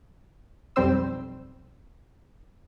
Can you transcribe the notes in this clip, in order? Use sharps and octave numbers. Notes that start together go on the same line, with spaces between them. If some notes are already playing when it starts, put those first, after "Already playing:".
B1 F2 G3 C4 C5 E6